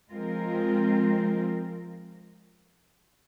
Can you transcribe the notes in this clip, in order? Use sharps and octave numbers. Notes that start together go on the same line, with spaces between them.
F3 G#3 C4 F4 A#4